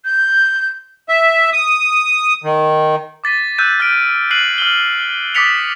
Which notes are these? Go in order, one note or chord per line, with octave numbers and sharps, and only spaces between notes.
G6
E5
D#6
D#3
D6 A6 B6 D#7
E6 F#6 G6 D#7
F6 G6 A6 D7
F#6 C7 D#7 F#7
F6 F#7 G7
D6 D#6 A6 B6 C#7 F7